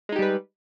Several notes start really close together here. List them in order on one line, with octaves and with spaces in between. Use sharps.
G#3 D#4 G4 G3 B4